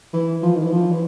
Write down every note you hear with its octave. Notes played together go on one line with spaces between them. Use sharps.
E3
F3
D#3
E3
F3
E3